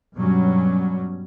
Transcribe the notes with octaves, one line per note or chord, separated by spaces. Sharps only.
G2 B2 F#3 G3 C#4